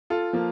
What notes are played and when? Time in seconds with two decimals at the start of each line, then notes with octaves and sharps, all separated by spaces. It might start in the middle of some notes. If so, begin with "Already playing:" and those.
0.10 F4 A4
0.33 F3 A#3